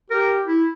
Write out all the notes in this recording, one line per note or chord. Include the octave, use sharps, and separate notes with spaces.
G4 A#4
E4